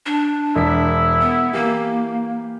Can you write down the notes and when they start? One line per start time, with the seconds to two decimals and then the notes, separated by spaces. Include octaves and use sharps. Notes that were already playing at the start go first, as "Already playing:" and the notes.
0.06 D4
0.55 E1 E4 B6
1.21 B3
1.53 E3 A#3 G4 A#4